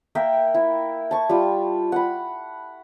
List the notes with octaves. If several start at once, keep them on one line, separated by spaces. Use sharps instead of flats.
A#3 A#4 E5 G5
E4
A5 C#6
G3 F4
F#5 B5